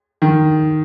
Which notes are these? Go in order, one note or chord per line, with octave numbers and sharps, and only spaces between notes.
D#3